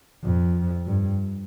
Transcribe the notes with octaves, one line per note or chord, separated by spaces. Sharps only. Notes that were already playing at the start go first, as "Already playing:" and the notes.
F2
G2